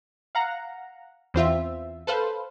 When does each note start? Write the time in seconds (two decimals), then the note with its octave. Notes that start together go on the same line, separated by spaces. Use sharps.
0.35 F5 F#5 A#5
1.34 E2 C4 F4 E5
2.07 A4 B4 C5 F5